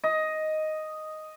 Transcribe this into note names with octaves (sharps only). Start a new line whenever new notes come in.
D#5